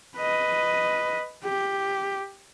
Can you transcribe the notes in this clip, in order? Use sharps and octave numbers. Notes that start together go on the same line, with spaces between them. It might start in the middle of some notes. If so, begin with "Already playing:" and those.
B4 D#5
G4